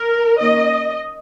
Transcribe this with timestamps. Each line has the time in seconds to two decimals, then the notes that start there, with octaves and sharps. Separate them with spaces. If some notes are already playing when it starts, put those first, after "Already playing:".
Already playing: A#4
0.39 D#3 A#3 C#4 D#5